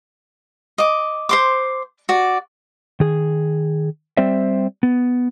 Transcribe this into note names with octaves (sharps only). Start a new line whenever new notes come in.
D#5 D6
C5 C6 D6
F#4 D5
D#3 G#4
G3 C4 C5 D5 E5
B3